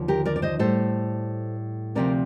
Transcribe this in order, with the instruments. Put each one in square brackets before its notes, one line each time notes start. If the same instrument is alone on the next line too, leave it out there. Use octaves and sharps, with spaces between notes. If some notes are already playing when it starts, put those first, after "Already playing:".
Already playing: [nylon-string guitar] D#2 D3 F3
G4 A#4
A#4 D5
D5
C5 D#5
A2 G3 A4 C5
D2 C3 F3 A#4 D5